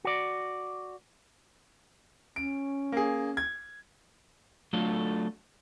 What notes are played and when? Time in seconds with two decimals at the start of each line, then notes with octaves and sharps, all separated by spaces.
0.05 F#4 D5
2.36 C#4 D7
2.92 A#3 G#4
3.37 G#6
4.73 F#3 A3 D4 F4 A4